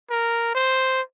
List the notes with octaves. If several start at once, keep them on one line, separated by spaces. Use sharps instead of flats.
A#4
C5